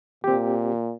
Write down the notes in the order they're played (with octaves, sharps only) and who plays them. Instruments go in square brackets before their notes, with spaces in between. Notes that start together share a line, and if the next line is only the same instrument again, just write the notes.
[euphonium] A#2 [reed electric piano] C4 G4